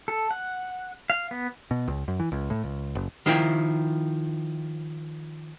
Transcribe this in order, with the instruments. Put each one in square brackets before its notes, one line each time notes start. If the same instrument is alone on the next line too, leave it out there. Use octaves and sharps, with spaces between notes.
[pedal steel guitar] A4
F#5
F5
B3
[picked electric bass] B2
C#2
F#2
E3
C#2
A2
C#2
F#1
[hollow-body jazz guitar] D#3 F3 E4 G5